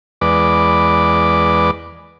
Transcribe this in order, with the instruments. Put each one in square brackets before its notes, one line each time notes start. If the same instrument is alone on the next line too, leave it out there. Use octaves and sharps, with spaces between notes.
[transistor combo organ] E2 G#3 B4 D5 D6